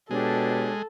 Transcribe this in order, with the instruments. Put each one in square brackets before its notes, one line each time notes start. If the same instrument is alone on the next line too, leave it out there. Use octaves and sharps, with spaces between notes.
[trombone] B2 [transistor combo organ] G#3 [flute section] D4 G4 C#5 [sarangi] A4